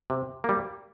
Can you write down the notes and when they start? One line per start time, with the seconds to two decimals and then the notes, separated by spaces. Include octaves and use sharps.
0.10 C3
0.44 G3 A#3